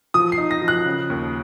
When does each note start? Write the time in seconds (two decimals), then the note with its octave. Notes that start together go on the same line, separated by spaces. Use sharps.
0.14 F3 D#6
0.32 C7
0.38 D#4
0.51 A#6
0.62 F3
0.68 F#6
0.85 C#3
1.10 D#2